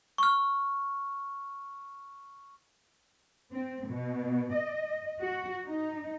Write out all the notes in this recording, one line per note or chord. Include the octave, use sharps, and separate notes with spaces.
C#6 F6
C4
B2
D#5
F#4
D#4